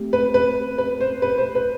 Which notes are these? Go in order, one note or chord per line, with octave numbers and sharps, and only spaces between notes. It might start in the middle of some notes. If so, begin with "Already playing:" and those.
Already playing: A3 C4 G4
B4
B4
B4
C5
B4
C5
B4